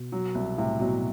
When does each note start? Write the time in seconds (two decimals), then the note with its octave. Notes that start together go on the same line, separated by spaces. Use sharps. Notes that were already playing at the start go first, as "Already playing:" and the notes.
Already playing: B2
0.12 F#3
0.35 C2
0.58 A2 C3
0.80 B2 F#3